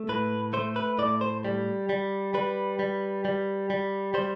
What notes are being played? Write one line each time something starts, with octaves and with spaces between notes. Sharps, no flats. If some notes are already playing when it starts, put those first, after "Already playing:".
Already playing: A3
A2 B4
A3 C5
B4
A2 D5
C5
G3
G3
G3 B4
G3
G3
G3
G3 C5